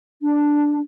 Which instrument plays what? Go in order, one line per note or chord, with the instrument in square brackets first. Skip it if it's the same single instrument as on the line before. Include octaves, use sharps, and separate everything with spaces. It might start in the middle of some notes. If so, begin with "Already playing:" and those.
[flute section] D4